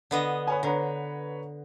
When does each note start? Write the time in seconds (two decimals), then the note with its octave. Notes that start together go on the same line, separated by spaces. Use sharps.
0.11 D3 B3 D#5
0.47 B4 C#5 G#5
0.63 D3 B4 C#5 A#5